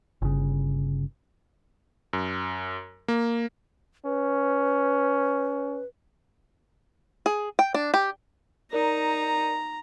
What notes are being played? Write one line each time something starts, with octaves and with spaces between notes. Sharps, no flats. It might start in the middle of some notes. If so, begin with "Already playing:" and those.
G1 C#3
F#2
A#3
C#4 B4
G#4
G5
D4
G4
D#4 A#4 D5 A#5